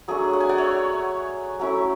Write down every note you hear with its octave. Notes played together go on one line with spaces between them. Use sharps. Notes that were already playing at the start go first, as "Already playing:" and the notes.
F#3 A3 D4 G#4
F#5
G#5
D5 F#5
C#5 E5
F#3 A3 C#4 E4